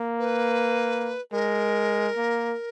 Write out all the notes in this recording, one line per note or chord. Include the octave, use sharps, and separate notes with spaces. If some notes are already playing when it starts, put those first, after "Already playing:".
Already playing: A#3
B4
G#3 A#4
A#3